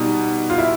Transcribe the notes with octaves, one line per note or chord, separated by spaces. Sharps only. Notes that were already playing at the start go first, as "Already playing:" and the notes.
Already playing: B2 G3 D#4
F4
E4